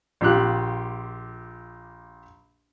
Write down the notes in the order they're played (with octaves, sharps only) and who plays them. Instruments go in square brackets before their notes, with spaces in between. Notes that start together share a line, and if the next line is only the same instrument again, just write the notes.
[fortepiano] A#1 F4 G4 F#6